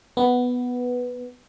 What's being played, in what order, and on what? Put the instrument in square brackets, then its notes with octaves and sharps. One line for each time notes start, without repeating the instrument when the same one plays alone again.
[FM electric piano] B3